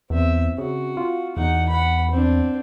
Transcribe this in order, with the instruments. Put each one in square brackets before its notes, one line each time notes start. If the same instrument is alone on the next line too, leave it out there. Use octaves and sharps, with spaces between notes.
[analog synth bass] E2 [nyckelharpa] C4 E5
[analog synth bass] C#3 [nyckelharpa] F#4
[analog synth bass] F4
[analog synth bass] E2 [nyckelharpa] D#4 F#5
[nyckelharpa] F#5 B5
C4 D4